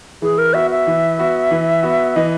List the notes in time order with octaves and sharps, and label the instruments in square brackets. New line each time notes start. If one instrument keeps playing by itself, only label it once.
[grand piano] E3 [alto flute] G#4
[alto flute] A#4
[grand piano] B3 F#4 [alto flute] E5
[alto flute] E5
[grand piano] E3
B3 F#4
E3
B3 F#4
[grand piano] E3 [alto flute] D#5